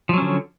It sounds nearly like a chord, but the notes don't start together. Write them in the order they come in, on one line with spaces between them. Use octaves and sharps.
F3 F#3 C#4 D3